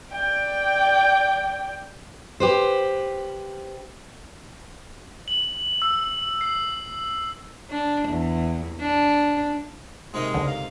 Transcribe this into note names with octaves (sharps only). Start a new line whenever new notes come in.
D5 G5
G4 B4 C5
F#7
E6
C7
D4
E2
D4
G#2 C3 D#3 G#3
C#2 D3
F5